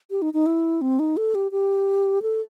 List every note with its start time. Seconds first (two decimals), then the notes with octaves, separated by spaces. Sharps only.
0.11 G4
0.22 D#4
0.34 D#4
0.46 E4
0.81 C4
0.99 D#4
1.17 A4
1.35 G4
1.52 G4
2.22 A4